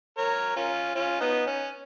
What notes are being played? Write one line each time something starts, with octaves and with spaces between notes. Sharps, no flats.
A#4 C#5
C#4 F4
C#4 F4
B3 D#4
C#4